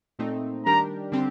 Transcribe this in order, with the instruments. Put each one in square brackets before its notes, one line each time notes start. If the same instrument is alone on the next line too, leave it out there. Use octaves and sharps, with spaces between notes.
[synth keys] A#2 A3 C4 D#4
[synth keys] D#3 G3 D4 G4 A#4 [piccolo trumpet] A#5
[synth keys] D3 G3 C4 G4